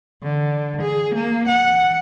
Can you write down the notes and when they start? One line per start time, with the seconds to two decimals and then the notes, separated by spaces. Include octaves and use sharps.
0.23 D3
0.82 G#4
1.15 A#3
1.48 F#5